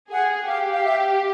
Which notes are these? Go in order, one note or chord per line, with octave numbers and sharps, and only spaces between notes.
G#4 F#5
G4 F5
F5
E5